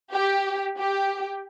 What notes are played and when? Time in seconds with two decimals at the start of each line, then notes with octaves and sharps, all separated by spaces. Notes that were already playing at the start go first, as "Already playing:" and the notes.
0.13 G4
0.78 G4